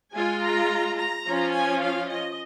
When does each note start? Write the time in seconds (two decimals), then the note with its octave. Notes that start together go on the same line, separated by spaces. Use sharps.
0.14 G#3 F4 G#5
0.42 A#5
0.98 A#5
1.26 F3 C#4 F4
1.55 G#5
1.82 F5
2.11 D#5